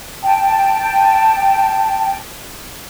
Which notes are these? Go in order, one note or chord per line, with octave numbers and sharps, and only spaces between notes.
G5 A5